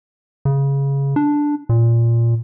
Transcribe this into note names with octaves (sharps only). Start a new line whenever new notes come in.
C#3
D4
A#2